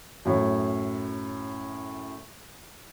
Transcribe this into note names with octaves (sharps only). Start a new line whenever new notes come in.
F#2 A2